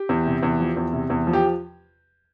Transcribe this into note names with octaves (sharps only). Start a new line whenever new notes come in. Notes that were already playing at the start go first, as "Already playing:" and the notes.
Already playing: G4
E2
C3
E2
F3
E2
C3
E2
F3
G4